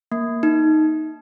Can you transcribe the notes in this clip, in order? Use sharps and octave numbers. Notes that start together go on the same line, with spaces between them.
A#3
D#4